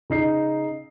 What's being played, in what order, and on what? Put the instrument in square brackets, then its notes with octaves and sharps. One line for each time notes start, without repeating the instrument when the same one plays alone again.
[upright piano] C#3 D#4 C7